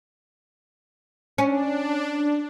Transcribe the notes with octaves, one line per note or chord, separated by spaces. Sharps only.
C#4 D4